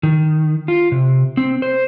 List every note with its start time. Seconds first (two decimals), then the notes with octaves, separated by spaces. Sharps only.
0.03 D#3
0.68 F4
0.92 C3
1.37 C4
1.62 C5